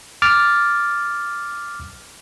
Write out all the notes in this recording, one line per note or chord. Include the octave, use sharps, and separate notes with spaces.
D6 F6 A6